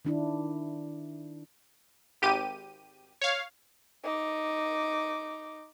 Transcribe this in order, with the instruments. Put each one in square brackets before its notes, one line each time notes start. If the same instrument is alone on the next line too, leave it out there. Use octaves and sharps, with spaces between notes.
[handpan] D#3 D4 E4
[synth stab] G#1 G4 D#7
C#5 F5
[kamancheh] D#4 D6